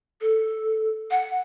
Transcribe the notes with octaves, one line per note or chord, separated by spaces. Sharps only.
A4
F#5